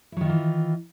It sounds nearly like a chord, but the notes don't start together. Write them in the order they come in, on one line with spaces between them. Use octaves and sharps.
E4 F#3 D#3 F4 E3